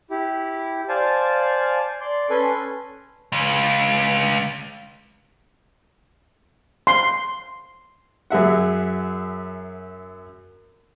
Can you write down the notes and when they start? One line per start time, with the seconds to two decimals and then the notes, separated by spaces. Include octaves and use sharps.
0.10 E4 G4
0.89 C5 D5 F5 G#5 A5
2.00 D5 C6
2.30 C#4 A4 B4 G#5 C6
3.32 C#2
6.87 C6
8.30 F#2 G#4 E5 F#5